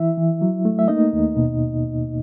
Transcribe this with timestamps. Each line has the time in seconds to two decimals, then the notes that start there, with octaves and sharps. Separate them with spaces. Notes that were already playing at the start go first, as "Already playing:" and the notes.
Already playing: E3 E4 E5
0.18 E3
0.42 F#3
0.65 A3
0.79 E5
0.88 A#3 D#4 D#5
1.13 D#2
1.36 B2